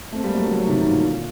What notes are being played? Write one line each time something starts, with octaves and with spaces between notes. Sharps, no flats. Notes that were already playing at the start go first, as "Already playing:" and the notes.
A3 C4
G3 A#3
F#3 A3
D3 F#3
D3 F#3
C3 D#3
C3 D#3
A#2 D3